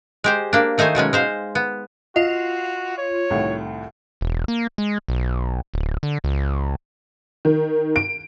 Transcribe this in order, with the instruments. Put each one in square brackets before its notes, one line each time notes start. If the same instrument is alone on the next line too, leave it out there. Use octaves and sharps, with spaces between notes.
[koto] G#3 G4 C5
A#3 D4
D#3 A3 D#4 C5 G#5
B2 F#3 G#3 C#4
G#3 C5 F5
B3
[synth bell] F4 [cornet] F#4 [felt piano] D#5
[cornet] C#5
[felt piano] C2 A2 D#3
[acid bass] E1
A#3
G#3
B1
D1
D3
C#2
[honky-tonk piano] D#3
D7